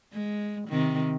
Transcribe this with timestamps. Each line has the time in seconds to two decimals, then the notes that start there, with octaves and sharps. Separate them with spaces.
0.13 G#3
0.69 C3 D#3